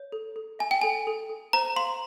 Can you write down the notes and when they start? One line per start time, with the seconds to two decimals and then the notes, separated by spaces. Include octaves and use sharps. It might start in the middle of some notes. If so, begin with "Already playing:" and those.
Already playing: C#5
0.12 A4
0.36 A4
0.59 E5 G#5
0.71 G5
0.82 A4 G#5
1.07 A4
1.30 A4
1.53 C5 A#5
1.76 F5 C6